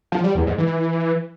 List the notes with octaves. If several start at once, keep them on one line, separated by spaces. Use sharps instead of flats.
F3
G3
E2
G#2
E3